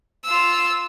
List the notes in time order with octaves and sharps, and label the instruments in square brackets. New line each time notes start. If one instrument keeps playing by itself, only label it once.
[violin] F4 E6